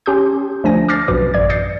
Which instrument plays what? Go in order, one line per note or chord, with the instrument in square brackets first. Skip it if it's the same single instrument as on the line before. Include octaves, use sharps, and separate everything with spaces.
[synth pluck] C#4 G4 C6 D#6 G6
D2 F3 A3 D4 G#5 A#6
D6 F6 G6 A6 A#6 C7
B1 F#2 B2 B4 D6
A1 D5 G#6
D#6 G6 A6 C7 C#7